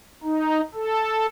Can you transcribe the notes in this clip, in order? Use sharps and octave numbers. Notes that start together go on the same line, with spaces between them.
D#4
A4